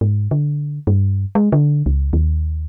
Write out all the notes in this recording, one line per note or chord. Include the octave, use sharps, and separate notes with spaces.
G#2
D3
G2
G#3
D3
C#2
D#2